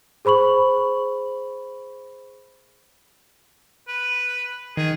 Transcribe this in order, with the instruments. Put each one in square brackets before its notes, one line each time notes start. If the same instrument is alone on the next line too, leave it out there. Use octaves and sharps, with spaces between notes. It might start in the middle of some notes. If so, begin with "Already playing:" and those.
[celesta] G#4 C5 B5 C#6 F#7
[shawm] B4
[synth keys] D#3 [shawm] G#4